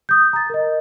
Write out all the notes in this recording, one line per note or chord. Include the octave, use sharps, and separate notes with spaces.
D#6 G6
A#5 A6
A#4 D#5